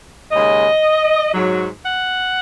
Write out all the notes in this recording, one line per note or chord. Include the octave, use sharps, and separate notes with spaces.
D#2 C#3 G#3 D#5
G#2 F#3
F#5